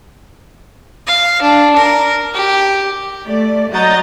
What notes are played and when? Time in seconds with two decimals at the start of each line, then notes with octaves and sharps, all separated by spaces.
1.07 F5
1.42 D4
1.76 A#4
2.34 G4
3.26 A3 D5
3.71 F#3 F#4 D#5 A#5 G6 A6